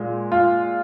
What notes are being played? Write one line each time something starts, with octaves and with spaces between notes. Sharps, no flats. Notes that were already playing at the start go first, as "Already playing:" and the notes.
Already playing: A#2 G#3
F4